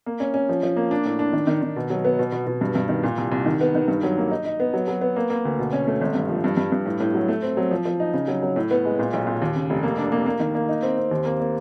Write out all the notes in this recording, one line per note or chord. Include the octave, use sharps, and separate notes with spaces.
A#3
C#4
C#4
F3
F3
A#3
D4
A2
D4
D#3
D#3
D#3
B2
F#3
B3
B2
B2
B2
G2
G2
D#3
A#2
C2
C2
D#3
B3
D#3
G2
F#3
A#3
D#4
D#4
B3
F#3
F#3
B3
A#3
A#3
D2
B2
C#4
A3
G#1
G2
F3
G2
G2
G2
A2
A2
F#3
A3
C4
F#3
F3
F3
D#4
C#3
F#3
F#3
A2
B3
G#3
A#2
B1
A#2
D#2
C#3
F1
A#3
D4
A#3
A#3
D#3
A#3
D#4
C4
C4
D#2
A#3
A#3